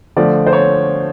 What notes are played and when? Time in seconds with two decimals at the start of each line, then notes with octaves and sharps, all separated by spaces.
0.17 D3 F3 A3 D5
0.46 C5
0.53 C#5